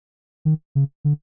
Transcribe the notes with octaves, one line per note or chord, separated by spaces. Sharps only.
D#3
C#3
D3